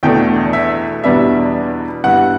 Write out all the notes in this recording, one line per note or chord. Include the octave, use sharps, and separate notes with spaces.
E2 B2 A3 D4 G5
E5
E2 B2 G3 B3 D4 E5
G2 E3 G3 B3 E4 F#5